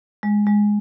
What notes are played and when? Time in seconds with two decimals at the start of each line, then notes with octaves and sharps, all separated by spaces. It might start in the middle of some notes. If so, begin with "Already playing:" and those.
0.23 G#3
0.47 G#3